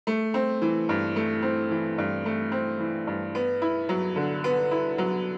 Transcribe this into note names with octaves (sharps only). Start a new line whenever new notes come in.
A3
C4
E3
G2
A3
C4
E3
G2
A3
C4
E3
G2
B3
E4
F#3
D3
B3
E4
F#3